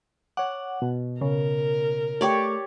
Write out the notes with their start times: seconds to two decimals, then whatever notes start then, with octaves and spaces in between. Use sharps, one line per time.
0.37 C#5 F#5 D6
0.82 B2
1.21 C#3 A#4
2.21 A3 G4 C#5 D5